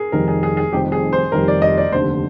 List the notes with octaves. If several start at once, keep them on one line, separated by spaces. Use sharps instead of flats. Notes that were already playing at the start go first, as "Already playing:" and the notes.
Already playing: G#4 A#4
F1 F2 D#3 G3 A#4
G#4
G#4
G#4
F1 F2 D#3 G3 G4
G#4
C5
F1 F2 D#3 G3 A#4
D5
D#5
D5
F1 D#2 D3 C5